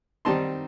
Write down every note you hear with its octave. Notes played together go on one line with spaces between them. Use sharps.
D#3 G3 C4 D#4 A5 C6